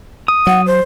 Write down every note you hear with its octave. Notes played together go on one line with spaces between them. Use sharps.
D#6
F#3 F#5
C5